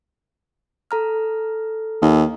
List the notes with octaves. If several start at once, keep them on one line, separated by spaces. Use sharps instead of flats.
A4 A#5 F6
D#2